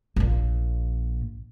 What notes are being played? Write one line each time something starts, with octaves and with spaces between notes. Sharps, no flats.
A#1 A#2